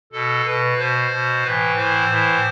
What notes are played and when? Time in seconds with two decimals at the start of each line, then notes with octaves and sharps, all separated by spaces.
0.13 B2 A4
0.45 B2 B4
0.78 B2 C5
1.11 B2
1.43 A2 E3 B4
1.76 A2 E3 C5
2.09 A2 E3